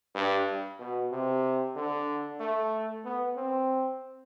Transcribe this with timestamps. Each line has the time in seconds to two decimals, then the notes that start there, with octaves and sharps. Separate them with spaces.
0.15 G2
0.79 B2
1.12 C3
1.76 D3
2.40 A3
3.05 B3
3.36 C4